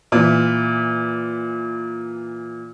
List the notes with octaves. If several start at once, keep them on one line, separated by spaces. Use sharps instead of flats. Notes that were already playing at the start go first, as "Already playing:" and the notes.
A#2 E3